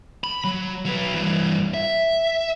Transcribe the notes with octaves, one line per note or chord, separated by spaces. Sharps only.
B5
F#3
F#3 B4
G2 E3
E5